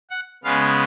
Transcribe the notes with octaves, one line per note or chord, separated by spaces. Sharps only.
F#5
C#3 G#3 B3 F5